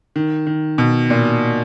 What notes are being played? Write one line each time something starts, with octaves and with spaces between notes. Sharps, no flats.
D#3
D#3
B2
A#2